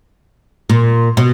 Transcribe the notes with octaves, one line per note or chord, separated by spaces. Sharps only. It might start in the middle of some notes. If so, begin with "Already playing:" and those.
A#2
B2